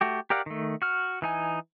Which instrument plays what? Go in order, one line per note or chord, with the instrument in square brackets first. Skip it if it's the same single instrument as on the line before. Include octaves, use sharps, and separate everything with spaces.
[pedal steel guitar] A3 F#4 G4
G4 A#4 D5 F5 F#5
D#3 A3
F#4 F6
E3 D#4 G#5